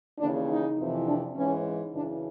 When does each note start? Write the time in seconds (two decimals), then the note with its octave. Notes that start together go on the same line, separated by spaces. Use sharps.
0.19 D#2 C#3 E3 D4
0.49 D#4
0.77 F2 C3 E3
1.07 D4
1.35 G#2 E3 C#4
1.93 F#2 C#3 E3 D4